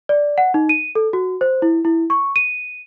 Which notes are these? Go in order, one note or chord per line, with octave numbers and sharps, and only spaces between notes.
D5
F#5
D#4
D#7
A4
F#4
C5
E4
E4
C#6
D#7